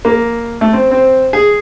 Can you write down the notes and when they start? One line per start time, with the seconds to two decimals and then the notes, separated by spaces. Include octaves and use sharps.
0.05 A#3
0.61 A3
0.73 C4
0.91 C4
1.33 G#4